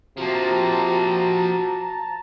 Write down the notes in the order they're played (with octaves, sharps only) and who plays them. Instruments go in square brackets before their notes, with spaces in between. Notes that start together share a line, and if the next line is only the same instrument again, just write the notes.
[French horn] C3 [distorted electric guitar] F3 A#3 [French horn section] F#4 [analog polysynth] A5 A#5